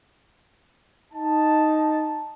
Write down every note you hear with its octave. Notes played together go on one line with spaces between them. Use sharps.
D#4 A5